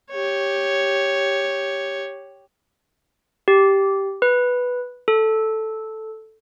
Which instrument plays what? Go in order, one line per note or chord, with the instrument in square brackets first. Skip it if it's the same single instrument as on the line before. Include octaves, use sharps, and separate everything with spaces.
[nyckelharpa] G4 C#5
[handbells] G4
B4
A4